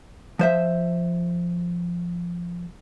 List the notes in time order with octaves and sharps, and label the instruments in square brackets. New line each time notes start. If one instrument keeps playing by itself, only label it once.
[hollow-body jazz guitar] F3 C5 E5